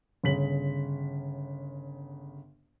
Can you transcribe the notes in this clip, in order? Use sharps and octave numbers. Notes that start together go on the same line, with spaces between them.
G1 C#3 B6 F#7